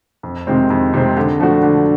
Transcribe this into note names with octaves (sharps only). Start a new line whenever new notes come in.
F2
C3 D#3 G#3 C4
F2
C3 D#3 G#3 C4
D3
F3 A3 D4 F#4
D3